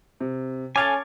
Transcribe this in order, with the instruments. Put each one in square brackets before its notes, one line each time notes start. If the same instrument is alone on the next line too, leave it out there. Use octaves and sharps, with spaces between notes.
[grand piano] C3
[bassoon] C#4 [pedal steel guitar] A4 F5 G#5 [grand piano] D6 G#6 A6